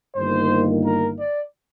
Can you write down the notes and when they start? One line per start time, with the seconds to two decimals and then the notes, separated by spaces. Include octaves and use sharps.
0.16 G1 G2 D#3 A#3 C5
0.84 A#4
1.17 D5